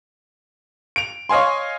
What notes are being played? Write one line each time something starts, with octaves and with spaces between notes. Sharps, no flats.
D7 F7
C#5 D#5 F5 G#5 C6